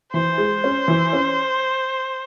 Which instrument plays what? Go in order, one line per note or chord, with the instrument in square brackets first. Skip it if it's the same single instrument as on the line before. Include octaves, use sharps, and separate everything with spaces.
[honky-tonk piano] E3 [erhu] C5
[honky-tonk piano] G#3
C#4
E3
C#4